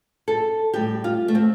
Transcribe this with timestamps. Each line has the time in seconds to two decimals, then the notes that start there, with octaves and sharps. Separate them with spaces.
0.28 A4
0.73 A2 G3 G4
1.04 F4
1.28 A3
1.35 C4